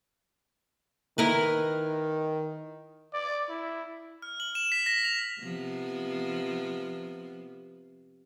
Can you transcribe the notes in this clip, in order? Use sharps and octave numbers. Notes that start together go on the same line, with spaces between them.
D#3 E4 A#4 B4
D5
E4
F6
F#7
E7
B6
A#6
F7
C3 F3 B3